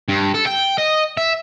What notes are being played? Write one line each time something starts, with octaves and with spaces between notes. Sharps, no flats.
G2
A4
G5
D#5
E5